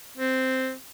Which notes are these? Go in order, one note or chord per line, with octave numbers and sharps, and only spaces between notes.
C4